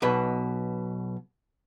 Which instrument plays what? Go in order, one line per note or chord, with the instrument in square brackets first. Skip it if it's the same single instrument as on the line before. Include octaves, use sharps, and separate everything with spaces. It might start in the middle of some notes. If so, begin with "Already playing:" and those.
[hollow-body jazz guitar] B1 B2 B4